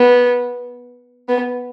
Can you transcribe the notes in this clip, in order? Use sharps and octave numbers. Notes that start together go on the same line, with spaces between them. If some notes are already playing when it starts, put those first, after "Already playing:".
Already playing: B3
B3